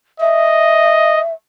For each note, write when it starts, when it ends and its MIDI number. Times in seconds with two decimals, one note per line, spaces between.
0.20 1.20 75
0.20 1.33 76